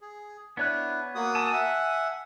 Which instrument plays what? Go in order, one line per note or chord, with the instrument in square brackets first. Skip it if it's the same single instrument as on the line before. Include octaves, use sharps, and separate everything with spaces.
[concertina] G#4
[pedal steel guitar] B3 C#5 F#6 [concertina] D4 E4
[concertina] A#3 F#4 D#6
[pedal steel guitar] G#5 A5 E6
[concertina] E5 F#5